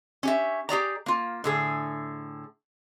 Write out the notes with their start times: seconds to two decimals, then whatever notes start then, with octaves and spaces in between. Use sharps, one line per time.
0.23 C#4 G4 E5
0.69 G4 G#4 D5 A#5
1.06 A#3 F4
1.44 A2 D3 G#4